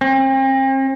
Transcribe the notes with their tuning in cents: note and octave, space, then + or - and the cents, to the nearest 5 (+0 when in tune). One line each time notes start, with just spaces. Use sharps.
C4 +40